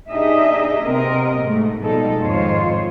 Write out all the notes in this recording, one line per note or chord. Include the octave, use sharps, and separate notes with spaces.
D4 D#4 G4 G#4 D#5 E5
C3 B3 C4 A#4 D#5
G#2 A3
B2 F3 G3 G#3 D#4 A4
F2 G#2 D#3 F4 C5 C#5